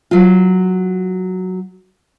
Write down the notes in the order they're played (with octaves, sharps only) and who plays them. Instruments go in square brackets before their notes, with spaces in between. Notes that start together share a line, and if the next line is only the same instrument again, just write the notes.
[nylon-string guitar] F#3 F4